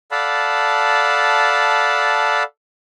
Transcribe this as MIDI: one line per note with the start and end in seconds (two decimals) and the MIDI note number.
0.11 2.43 69
0.11 2.43 74
0.11 2.43 77
0.11 2.43 78
0.11 2.43 81
0.11 2.43 83